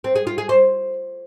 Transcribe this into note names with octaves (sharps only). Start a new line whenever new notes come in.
C4
G#4
F4
G#4
C5